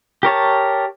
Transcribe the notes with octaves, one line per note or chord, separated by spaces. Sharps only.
G4 A#4 C#5 A5